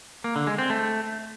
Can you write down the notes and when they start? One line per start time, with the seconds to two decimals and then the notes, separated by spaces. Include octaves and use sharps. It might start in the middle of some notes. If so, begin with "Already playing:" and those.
0.24 A#3
0.36 D3
0.47 G#3
0.58 C4
0.70 A3